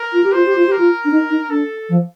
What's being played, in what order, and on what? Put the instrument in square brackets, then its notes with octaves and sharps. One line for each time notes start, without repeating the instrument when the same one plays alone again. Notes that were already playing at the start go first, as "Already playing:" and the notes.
Already playing: [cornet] A#4
[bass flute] F4
G4
[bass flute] F4 [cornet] C5
[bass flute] G4
F4
G4
[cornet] A#4
[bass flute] F4
D4
D#4
D#4
[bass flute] D4 [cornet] A4
[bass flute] F3